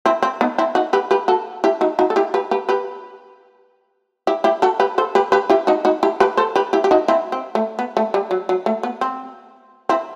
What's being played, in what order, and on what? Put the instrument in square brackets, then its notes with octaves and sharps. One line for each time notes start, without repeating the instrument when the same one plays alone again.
[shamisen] C4 E4
C4
B3 D#4
C4 E4
D#4 F#4
G4 B4
G4 B4
F#4 A4
E4 G4
D#4 F#4
D#4 F#4
A4
E4 G4
G4 B4
G4 B4
G4 B4
E4 G4
E4 G4
F#4 A4
G4 B4
A4 C5
G4 B4
G4 B4
E4 G4
D#4 F#4
D#4 F#4
E4 G4
G4 B4
A4 C5
G4 B4
E4 G4
G4
D#4 F#4
C4 E4
C4
A3
B3
A3
G3
F#3
F#3
A3
B3
C4
C4 E4